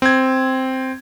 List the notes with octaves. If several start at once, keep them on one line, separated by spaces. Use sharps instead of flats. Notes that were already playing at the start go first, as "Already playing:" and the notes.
C4 G#6